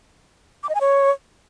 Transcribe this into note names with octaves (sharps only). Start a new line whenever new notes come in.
D6
D#5
G#5
C#5